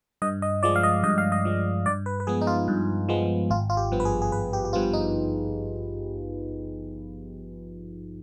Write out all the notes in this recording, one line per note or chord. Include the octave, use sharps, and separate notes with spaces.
G2 D#5
D#5
F3 G#3 D5
F5
D#5
G2 D#5
F5
D#5
F3 G#3
G2 D5
B4
B4
F3 G#3 B3 G#4
D#4
F4
G2
F3 G#3 B3
G#1 F4
F4
G4
G2 F3 B3
B4
G#4
G#4
G#1 B4
G4
G4
G2 F3 B3 F4
D#4